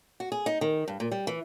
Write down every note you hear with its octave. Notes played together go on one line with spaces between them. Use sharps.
F#4
G#4
D#4
D#3
G2
A#2
G3
E3